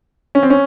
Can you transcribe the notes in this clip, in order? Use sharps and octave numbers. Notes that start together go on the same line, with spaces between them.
C#4
C4
C#4